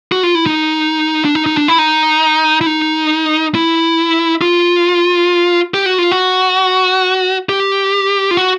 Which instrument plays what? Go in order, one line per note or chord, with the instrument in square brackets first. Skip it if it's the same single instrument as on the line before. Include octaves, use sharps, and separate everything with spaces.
[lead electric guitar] F#4
F4
E4
D#4
D4
D#4
D#4
D4
E4
D#4
E4
D#4
E4
F4
G4
F#4
F4
F#4
G4
F4
F#4